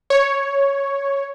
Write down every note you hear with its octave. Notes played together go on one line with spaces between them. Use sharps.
C#5